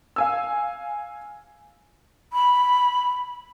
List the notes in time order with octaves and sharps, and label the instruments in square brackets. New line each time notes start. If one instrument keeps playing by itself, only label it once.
[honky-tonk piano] F5 G#5 E6
[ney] B5